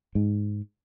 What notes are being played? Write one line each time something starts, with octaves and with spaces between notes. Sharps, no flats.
G#2